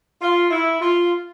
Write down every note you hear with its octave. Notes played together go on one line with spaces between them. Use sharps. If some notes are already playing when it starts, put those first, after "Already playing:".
F4
E4
F4